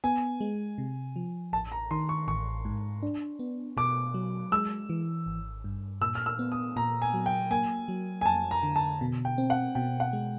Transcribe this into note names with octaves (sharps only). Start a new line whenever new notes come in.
B3 G#5
G#3
C3
F3
A1 A5
A#5
D#3 C6
C#6
A1 C#6
G#2
D4
B3
B2 D6
F#3
G#3 E6
E3
G#1
G2
A#2 E6
F6
E6
B3
D#6
A#2 A#5
G#5
F#3
G5
A#3 G#5
F#3
G#5
F2 A5
A#5
D3
A5
B2
G5
C4
F#5
B2 G5
F#5
G#3